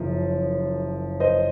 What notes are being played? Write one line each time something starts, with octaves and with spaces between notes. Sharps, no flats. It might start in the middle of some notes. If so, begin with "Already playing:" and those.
Already playing: F#1 F#2 F3
C5 D#5